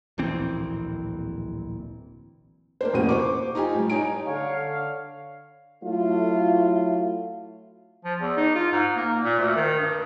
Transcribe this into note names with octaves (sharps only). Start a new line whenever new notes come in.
D1 A#1 E3 C4
A#3 D4 C5
D#1 A1 F2 C#3 F#4 D#7
C5 C#6 D6
D#4 F4 G4 G#5
A1 G3
D#4 C#5 G#5 D7
D3 C#5 F5
F#3 A3 E4 F4
F3
E2
D#4
F4
G#2
A#3
A#2
D2
D#3
G2